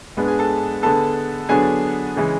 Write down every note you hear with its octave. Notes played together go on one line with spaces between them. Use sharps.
G#2 G#3 B3 D4 B4
G#4 G#5
A4 A5
D3 G#3 B3 A4 A5
D3 F#3 B3 D4 G#4 G#5
C#3 E3 G#3